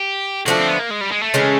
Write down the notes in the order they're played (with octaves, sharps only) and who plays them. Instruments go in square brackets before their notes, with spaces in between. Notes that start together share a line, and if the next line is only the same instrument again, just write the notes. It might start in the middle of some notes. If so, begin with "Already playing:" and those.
Already playing: [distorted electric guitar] G4
[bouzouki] D3 F3 A3 D4 [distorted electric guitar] F#4
[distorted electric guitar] C4
B3
A#3
G#3
G3
G#3
A3
[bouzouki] C#3 E3 G#3 C#4